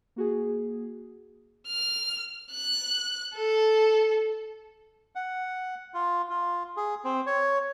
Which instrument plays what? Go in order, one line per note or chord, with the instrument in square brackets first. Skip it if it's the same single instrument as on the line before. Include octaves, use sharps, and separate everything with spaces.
[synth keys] A#3 F#4 G#4
[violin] F6
F#6
A4
[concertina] F#5
F4
F4
G#4
C4
C#5